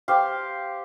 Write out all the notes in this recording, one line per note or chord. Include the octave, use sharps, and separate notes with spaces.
G4 C5 F5